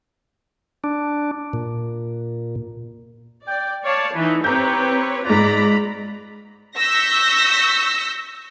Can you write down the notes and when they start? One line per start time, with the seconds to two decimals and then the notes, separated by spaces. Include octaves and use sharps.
0.84 D4
1.53 A#2
3.48 D5 G5
3.85 C#5 D5 F5 A5
4.15 E3 D#4 B4
4.44 C4 G4 B4 C#5 A#5 G6
5.25 G#2 F4 D5 A#5 B5 F#6
6.77 C#6 E6 G6 A#6 B6